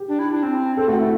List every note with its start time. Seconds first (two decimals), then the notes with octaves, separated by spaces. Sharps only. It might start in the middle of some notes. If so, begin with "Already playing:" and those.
Already playing: G4
0.08 D4
0.19 E4
0.31 D4
0.43 C4
0.77 C4 A4
0.87 A3 F#4
0.99 A3 E4